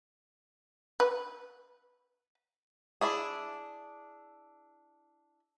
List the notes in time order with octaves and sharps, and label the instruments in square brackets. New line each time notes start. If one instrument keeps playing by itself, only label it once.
[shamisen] B4
[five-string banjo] D4 E4 G#4